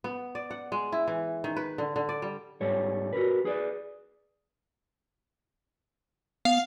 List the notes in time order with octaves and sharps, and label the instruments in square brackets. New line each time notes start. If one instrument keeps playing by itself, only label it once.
[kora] B3
D5
F#5
G#3
E4
E3
D#3
B4
D3
D3
D5
G3
[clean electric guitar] G#2 G3 A4 C#5
F#4 A#4 B4
G#4 B4 D5
[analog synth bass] B3 [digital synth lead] F5